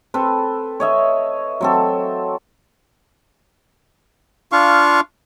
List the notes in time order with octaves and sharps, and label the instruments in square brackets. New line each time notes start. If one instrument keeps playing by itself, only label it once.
[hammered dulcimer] C4 A4 B4
C#5 D#5 E5
F#3 C4 A4
[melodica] D4 F4 F5 C#6